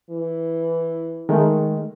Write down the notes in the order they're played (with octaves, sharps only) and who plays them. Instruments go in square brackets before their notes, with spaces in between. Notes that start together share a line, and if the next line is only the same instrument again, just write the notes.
[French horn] E3
[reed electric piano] D#3 G#3 A3